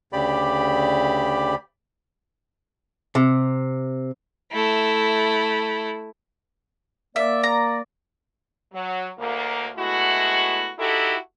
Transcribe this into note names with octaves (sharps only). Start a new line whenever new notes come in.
D2 C#3 G4 D5 B5
C3
A3 E4
A#3 D5 E5
A#5
F#3
D2 A#3
G#3 A3 B3 E4 F#4
D#4 E4 F#4 G4 A4